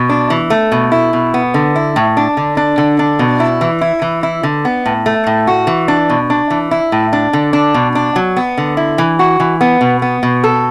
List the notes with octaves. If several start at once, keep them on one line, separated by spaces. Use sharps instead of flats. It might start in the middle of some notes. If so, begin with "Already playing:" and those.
Already playing: B2
D4
E3
A3
B2
E4
B2
B3
D3
E4
A2
D4
D3
D4
D3
D4
B2
E4
E3
E4
E3
E4
D3
B3
A2
A3
A2
F#4
E3
D4
B2
D4
E3
E4
A2
D4
D3
D4
B2
D4
F#3
B3
D3
E4
E3
F#4
E3
B3
B2
B3
B2
A4